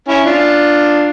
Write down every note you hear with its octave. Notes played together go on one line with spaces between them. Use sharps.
C#4 E4
D4 F4